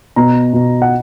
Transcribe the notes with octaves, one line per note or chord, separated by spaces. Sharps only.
B2 A#5
B2
F#5